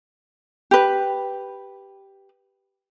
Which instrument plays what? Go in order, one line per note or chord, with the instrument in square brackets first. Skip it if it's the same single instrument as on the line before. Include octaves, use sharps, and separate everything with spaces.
[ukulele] G4 B4